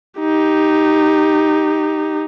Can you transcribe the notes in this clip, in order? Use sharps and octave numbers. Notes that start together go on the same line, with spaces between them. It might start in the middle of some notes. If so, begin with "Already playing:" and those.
D#4 G4